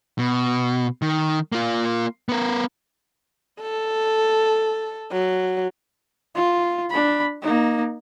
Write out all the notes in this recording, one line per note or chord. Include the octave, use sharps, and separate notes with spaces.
B2
D#3
A#3 F4
B3 A#4
A4
F#3
F4
D4 B5
A#3 D#4